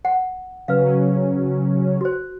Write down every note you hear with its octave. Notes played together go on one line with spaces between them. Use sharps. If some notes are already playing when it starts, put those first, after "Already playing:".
F#5
C#3 F#3 C#4 B4 F5
F#4 C5